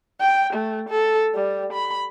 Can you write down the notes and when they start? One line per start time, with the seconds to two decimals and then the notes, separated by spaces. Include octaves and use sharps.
0.21 G5
0.53 A3
0.89 A4
1.35 G3
1.73 B5